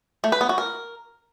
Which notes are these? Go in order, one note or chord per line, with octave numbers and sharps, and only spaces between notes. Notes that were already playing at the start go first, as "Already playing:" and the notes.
A3
B4
B3
F#4
A#4